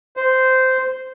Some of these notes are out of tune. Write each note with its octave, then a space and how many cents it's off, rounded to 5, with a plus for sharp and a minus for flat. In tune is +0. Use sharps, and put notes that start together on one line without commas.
C5 -10